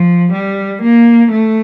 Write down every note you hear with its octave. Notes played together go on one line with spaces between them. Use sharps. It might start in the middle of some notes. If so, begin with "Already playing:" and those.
Already playing: F3
G3
A#3
A3